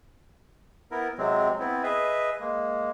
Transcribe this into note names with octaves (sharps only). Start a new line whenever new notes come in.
B3 E4 A#4
C3 F#3 G#3 C4
B3 C4 E4
G#4 B4 D#5 E5
G#3 A#3